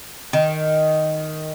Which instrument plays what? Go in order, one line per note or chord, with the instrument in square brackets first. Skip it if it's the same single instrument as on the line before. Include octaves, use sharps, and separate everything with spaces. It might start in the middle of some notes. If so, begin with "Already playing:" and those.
[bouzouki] D#3